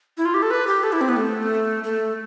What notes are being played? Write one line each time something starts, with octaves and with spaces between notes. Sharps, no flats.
E4
F4
G4
A4
B4
G4
A4
E4
C4
B3
A3
A3